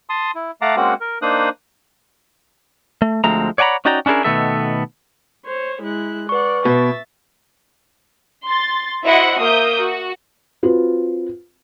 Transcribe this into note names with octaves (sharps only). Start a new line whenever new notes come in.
A5 C6 D#6
E4
A3 F5 F#5 A5 A#5 D6
G#3 A#3 C4 C#4 F#4 F#5
A#4
A#3 D4 D#4 C5 D#6 F#6
A3
D2 F3 G#3 A3 C4 A#5
C#5 D5 F#5 G#5 A#5 B5
C#4 D#4 F#4 D5 G5 A#5
C#4 D4 E4 G#4 A#4
B2 D#3 A3 B3 A4 E5
C5 C#5
G#3 E4 F#6
B4 D5 F#5 C#6
B2 E5 A6
C6 A6
E4 F#4 C5 D#5 E5 F#5
A#3 E5 D#6 G6
F#4
C4 F4 F#4 B4